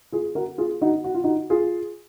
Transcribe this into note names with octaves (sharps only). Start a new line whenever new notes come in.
F4 G#4
F#4 A#4
F4 G#4
D#4 F#4
F#4
F4
D#4 F#4
F4 G#4